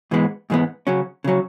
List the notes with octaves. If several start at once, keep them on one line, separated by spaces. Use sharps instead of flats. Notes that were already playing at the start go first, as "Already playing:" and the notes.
G#2 E3 G#3 B3
G#2 E3 G#3 B3
C#3 F#3 C#4
C#3 F#3 C#4